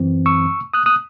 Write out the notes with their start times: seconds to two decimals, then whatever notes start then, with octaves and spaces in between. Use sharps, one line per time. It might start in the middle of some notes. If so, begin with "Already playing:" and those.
Already playing: F#2 E3 C4
0.26 C#6 E6
0.74 D#6 F#6
0.86 D#6 F#6